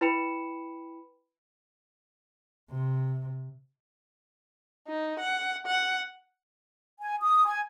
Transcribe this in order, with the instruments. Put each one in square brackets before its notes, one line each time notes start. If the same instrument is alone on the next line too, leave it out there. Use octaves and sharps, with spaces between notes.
[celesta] E4 B4 G5 B5 C#7 E7
[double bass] C3
[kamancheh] D#4
F#5
F#5
[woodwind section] G#5
D#6
G#5